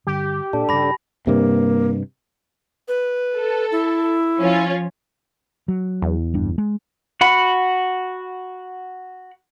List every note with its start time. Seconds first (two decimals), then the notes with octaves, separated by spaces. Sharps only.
0.07 G2 D3 G3 G4
0.53 A#2 D4 A4 A5
0.69 G2 C#3 B5 A#6
1.27 G2 C3 A#3
2.88 B4
3.36 A4
3.72 E4
4.40 F3 C#4 F4
5.68 F#3
6.02 E2
6.34 F#1 G2 D4
6.58 G#3
7.21 F#4 F#5 B5